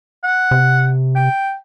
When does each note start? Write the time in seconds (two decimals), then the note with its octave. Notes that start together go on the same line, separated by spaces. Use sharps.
0.23 F#5
0.51 C3
1.16 G5